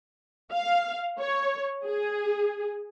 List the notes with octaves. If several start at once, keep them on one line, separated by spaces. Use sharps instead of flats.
F5
C#5
G#4